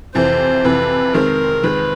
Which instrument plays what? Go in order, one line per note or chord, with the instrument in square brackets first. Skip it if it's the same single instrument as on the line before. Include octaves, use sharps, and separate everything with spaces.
[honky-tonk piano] F2 C3 E3 [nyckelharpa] C5
[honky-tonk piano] F2 C3 E3 [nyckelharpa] B4
[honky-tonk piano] D#3 G#3 C4 [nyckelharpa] A#4
[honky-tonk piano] D#3 G#3 C4 [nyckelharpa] B4